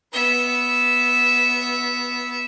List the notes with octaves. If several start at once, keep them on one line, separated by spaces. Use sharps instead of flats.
B3 E5